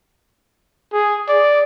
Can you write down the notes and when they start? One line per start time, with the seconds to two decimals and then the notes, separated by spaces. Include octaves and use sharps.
0.93 G#4
1.28 D5